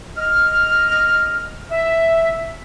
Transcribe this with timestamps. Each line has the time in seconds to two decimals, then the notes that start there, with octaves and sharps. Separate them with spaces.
0.18 D#5 F6
1.72 E5